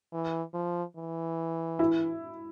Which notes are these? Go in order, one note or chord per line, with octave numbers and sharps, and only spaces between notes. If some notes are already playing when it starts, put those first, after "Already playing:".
E3
F3
E3
E4